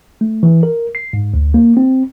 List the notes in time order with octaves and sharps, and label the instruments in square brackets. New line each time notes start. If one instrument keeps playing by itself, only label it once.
[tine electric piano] A3
E3
A#4
C7
G#2
D2
A#3
C4